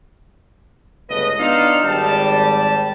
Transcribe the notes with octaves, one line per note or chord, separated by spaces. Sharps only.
G1 C#2 A3 B4 D#5
B3 D4 D#4 F4 A4 F5
G#1 G3 A5